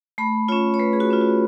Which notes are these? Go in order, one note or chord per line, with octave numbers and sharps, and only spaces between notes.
A3 B5
C#4 F4 C#5
C#5
A3 B4
G#4
F#4
C#4 F4
F#4